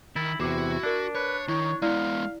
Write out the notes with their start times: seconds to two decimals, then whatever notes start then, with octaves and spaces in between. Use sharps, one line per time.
0.16 D#3 E4 A6
0.40 E2 C3 E4 F#4 D6 C7 E7
0.83 D4 A#4 D5
1.15 B4 C#5
1.48 D#3 E4 C#5
1.82 G#3 B3 E4 D5 F5